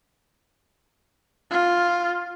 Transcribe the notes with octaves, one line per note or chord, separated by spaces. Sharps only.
F4